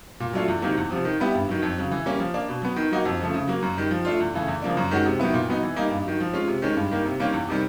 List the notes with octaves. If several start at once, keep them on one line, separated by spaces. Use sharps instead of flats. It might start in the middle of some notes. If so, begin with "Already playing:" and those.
A#2
F#3 A3 D4 F4
E2
C3 D#3 F#3 A#3
E2
C3 F3
D#3
G3 B3 E4 G4
G2
D#3 F#3
F2
C#3 F#3
E3
G3 A#3 C#4
F3
A#3 D4
B2
F#3 B3
D#3
F#3 A#3 D#4 F#4
F2
C#3 F3 A3
C#3
F#3 A#3
F#2
D#3 G3
F3
A3 D4 F4
E2
C#3 E3 A3
E2
C#3 F3 A#3 D4
F#2
D#3 G#3 C#4 F#4
C3
D#3 F#3 B3 E4
A#2
F#3 B3 D#4
E3
G3 A#3 D#4
G2
D#3 F#3
F3
G#3 C#4 F4
C3
D#3 G#3 C#4
G2
D#3 G3 A#3
C3
D#3 G3 A#3 C#4
E2
C3 D#3 G3